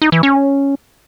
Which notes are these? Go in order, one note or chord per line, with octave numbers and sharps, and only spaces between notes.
D#4
E3
C#4